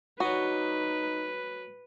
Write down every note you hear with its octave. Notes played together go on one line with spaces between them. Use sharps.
F#3 D4 D#4 F#4 B4 D#5